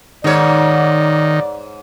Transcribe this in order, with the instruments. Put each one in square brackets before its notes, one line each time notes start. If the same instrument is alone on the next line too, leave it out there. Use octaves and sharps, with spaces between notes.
[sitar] G#2 C#5 [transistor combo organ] D#3 [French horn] D5